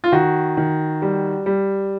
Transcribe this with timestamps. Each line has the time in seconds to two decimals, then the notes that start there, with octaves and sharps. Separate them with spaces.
0.04 F4
0.12 D#3 F#4
0.57 D#3
1.02 G3
1.46 G3